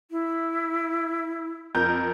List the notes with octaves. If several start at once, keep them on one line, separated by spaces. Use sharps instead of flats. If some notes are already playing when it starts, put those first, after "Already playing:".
E4
F2 A#4 G6